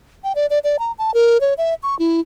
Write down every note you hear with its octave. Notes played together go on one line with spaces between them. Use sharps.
G5
D5
D5
D5
A#5
A5
A#4
C#5
E5
C#6
E4